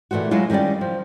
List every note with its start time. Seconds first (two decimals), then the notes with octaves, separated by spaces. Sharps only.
0.11 A#2 E3 A3 F4 F#4
0.31 F#3 G#3 E4 F4
0.50 D#3 G3 C#4 G4 D5
0.81 F3